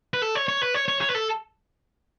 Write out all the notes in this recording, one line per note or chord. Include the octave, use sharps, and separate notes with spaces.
B4
A4
C#5
C#5
B4
C#5
C#5
C#5
B4
A4